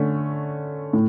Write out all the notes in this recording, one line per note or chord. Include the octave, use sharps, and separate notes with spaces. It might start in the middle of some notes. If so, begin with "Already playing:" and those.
Already playing: D3 A3 C#4
A2